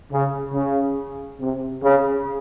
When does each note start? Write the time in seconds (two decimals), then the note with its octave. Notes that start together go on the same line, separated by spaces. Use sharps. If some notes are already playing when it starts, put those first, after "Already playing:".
0.11 C#3
0.53 C#3
1.40 C3
1.82 C#3